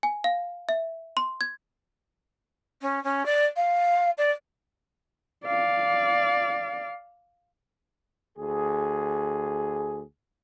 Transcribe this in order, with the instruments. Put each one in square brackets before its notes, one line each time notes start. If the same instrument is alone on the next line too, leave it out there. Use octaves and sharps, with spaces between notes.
[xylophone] G#5
F5
E5
C6
G#6
[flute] C#4
C#4
D5
F5
D5
[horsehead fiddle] D5 F5
[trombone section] D2 G#4